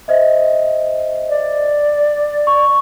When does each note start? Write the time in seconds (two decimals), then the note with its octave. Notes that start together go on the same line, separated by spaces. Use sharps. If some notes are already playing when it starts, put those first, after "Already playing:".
0.08 C5 D#5 E5
1.29 D5
2.47 C#6